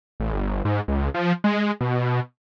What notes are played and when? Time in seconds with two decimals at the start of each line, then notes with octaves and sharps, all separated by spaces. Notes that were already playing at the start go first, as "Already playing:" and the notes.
0.20 A1
0.33 G1
0.65 G#2
0.88 C#2
1.14 F3
1.44 G#3
1.81 B2